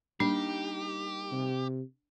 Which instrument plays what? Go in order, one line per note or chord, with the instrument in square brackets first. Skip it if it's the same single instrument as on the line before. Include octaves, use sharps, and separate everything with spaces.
[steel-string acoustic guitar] G3 A#3 D#4 [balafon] D4 [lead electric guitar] G4
[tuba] C3